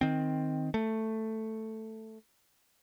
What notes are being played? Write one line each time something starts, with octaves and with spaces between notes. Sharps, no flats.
D#3 C4
A3